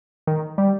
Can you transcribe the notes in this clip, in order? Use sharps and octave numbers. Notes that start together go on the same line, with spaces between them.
D#3
G3